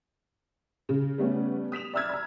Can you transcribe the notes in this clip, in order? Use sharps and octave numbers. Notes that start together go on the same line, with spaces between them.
C#3
G3 A3 B3 C#4
D#6 B6 E7 F7
D5 E5 A#5 E6 F6 G#6
A#5 B5